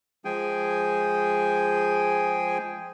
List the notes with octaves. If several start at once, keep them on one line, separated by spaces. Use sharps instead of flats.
F3 G#3 G#4 G5 G#5